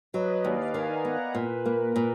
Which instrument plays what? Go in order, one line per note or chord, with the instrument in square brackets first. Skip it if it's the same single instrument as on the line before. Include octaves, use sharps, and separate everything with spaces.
[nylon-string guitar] F#3 [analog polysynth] B4 D#5
[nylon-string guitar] D#2 [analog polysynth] D5 F5
[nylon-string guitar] D#3 [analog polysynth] F5 G#5
[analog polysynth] F#5 A#5
[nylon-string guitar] B3
[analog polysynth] F#5 A#5
[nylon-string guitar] A#2 [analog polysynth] B4
[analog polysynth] B4
[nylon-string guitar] A#3
[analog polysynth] A#4
[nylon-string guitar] A#2